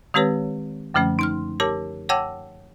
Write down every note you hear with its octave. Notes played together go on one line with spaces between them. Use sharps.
D#3 G#3 C4 G4 B4 C#5
F#2 D3 F3 A3 C#4
D#4 C6 F6
G4 A#4 C#5 A5 D6
C#5 F#5 G5 A5 D6 E6